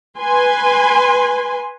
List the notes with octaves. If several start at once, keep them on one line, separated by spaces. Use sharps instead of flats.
B4 G#5 C6